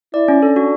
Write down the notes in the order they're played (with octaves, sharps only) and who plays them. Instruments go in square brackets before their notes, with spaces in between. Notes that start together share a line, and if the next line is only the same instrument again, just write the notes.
[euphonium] E4 [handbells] D5
[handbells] C#4
[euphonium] D4 [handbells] A4
[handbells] F#4